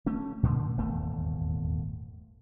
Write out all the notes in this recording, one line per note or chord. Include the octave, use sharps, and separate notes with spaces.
A3 C#4
A#2 D3 A3
D#1 G#1 E2 A3